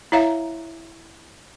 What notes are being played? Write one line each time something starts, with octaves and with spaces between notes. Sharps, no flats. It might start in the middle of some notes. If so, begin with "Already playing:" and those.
E4 C#5 E5 F5 A#5